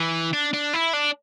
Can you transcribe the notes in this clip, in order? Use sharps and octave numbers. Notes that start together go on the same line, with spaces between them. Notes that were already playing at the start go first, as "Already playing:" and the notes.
Already playing: E3
D4
D4
E4
D4